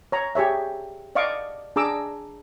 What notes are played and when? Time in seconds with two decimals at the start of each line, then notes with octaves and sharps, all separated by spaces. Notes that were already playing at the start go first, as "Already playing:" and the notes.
0.12 C#5 A#5
0.35 G4 G#4 C#5 E5
1.15 D5 D#5 F5 C#6 D6
1.76 D4 G#4 A#5 D6 E6